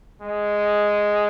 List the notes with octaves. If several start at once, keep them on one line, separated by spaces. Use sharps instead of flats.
G#3